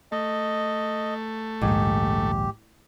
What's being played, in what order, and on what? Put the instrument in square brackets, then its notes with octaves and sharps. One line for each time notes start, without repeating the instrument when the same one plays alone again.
[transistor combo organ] A3 [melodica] D#5
[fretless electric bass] A#1 D#2 [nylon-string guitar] G#2 [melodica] G4